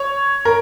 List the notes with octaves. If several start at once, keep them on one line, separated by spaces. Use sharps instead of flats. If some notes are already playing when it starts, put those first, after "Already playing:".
Already playing: C#5
A#4